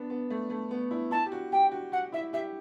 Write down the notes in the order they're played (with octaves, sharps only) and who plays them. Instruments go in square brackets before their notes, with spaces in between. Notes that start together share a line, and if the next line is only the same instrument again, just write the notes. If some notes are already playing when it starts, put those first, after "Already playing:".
Already playing: [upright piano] B3 D4
B3
A3
A3
B3
E4
[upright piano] E4 [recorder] A5
[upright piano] G4
F#4
[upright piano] G4 [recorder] G5
[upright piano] F#4
[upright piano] F#4 [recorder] F#5
[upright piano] E4 [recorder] E5
[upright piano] G4 [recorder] E5